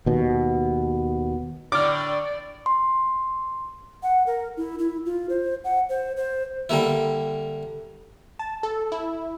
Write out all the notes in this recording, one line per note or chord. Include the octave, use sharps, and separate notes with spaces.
D#2 B2
A2 D3 D5 D6 F6
C6
F#5
A#4
E4
E4
F4
C5
F#5
C5
C5
D3 G3 A#3 E4
A5
A4
E4